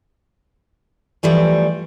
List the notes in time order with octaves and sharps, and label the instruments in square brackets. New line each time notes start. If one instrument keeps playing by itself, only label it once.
[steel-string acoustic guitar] E3 F3 G3 A3